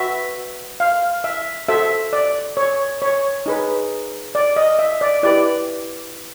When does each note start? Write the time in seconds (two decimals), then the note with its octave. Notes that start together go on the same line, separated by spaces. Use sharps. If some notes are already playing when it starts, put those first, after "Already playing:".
Already playing: F#4 B4 E5
0.80 F5
1.24 E5
1.68 F#4 A4 C5 E5
2.13 D5
2.57 C#5
3.02 C#5
3.46 D#4 G#4 B4
4.35 D5
4.56 D#5
4.79 E5
5.01 D5
5.23 E4 G4 B4 D5